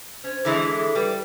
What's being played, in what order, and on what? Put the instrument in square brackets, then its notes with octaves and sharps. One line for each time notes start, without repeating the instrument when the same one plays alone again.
[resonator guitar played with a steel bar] C#4 [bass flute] C5
[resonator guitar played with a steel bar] D3 E3 G#3 [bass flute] G#4
[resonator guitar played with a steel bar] G3 [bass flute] B4